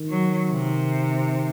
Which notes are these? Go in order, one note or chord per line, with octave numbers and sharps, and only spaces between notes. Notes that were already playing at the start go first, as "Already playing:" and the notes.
Already playing: D#3
F#3
C3